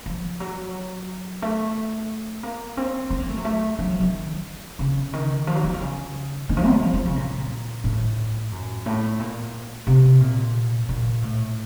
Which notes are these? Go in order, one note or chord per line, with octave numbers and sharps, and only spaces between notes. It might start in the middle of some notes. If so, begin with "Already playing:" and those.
F3
F#3
A3
A#3
C4
C4
A#3
A3
F#3
A3
F#3
F3
D#3
C#3
D#3
F3
F#3
F3
D#3
C#3
D#3
F3
C4
F#3
F3
F3
C#3
A#2
A2
F#2
A2
A#2
C3
A#2
A#2
A2